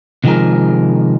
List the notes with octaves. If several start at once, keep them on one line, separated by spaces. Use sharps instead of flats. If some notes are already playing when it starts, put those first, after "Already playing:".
C3 D#3 F3 G#3 G#4 A#4